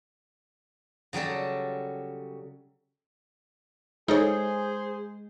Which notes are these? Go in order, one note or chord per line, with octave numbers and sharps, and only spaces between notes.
C#3 F#3 G3 A4
G#3 D#4 G#4 A4 C5 C#5